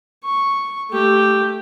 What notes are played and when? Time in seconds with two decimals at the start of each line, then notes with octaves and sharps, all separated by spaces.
0.24 C#6
0.91 A3 G4